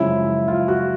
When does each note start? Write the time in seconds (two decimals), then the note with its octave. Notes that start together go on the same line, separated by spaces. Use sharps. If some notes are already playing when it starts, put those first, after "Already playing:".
Already playing: F#2 C#3 F3 G#3 E4
0.48 F4
0.68 F#4